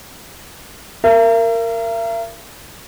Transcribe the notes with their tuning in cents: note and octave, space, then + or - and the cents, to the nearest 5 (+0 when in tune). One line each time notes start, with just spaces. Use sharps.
A#4 -15 E5 +45